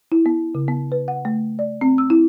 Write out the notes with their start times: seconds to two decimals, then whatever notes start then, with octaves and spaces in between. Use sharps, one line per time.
0.12 E4
0.26 B3
0.55 C#3
0.68 B3
0.92 B4
1.08 F#5
1.25 A3
1.59 D5
1.81 C4
1.98 E6
2.10 E4